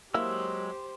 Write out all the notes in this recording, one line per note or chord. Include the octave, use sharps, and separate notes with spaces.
F#3 G#3 A#3 E4 G4 C5 E6